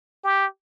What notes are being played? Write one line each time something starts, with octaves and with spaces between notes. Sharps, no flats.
G4